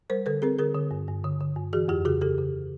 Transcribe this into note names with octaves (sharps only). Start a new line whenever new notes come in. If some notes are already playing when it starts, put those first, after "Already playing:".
G3 A#4 C5
D3 A4 B4
C4 G#4 A#4
D3 G#4 A#4
D3
G2
G2
D3
D3
G2
E3 F#4 G#4
F2 F4 G4
C#3 F#4 G#4
C#3 G4 A4
C#3